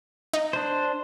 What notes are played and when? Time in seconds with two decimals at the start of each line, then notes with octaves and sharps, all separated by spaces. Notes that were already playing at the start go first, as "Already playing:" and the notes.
0.33 D#4
0.53 D4 C5